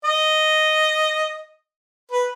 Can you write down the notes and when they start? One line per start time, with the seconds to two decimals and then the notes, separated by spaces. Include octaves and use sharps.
0.04 D#5
2.11 B4